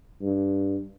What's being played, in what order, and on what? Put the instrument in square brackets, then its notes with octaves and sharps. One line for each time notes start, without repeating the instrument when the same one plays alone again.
[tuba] G2